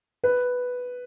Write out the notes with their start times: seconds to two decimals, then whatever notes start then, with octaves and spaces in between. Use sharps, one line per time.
0.24 B4